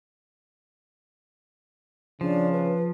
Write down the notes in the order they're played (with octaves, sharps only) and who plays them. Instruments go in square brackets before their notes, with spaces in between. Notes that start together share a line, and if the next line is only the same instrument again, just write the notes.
[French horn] C#3 [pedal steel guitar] F3 [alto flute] D4
[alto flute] B4